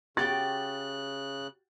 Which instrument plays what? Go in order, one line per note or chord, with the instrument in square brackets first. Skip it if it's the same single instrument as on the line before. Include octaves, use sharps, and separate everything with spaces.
[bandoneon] C#3 F#6 [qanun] F#4 G4 G5 [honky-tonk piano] A6